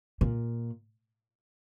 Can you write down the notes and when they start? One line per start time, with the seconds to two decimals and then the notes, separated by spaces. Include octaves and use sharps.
0.21 A#2